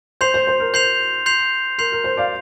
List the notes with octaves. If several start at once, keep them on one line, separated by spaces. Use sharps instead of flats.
C5 C6 G6 C7 F7
C5
C5
A#4
C5 C6 G6 C7 F7
C6 G6 C7 F7
A#4 C6 G6 C7 F7
A#4
C5
D5 F5